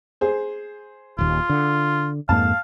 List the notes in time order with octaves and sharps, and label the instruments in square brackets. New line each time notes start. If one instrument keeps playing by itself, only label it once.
[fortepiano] G#4 C5
[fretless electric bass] D#1 D#2 [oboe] F4
[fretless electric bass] D3
[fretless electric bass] F2 G#2 A#3 [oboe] F5 [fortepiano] A5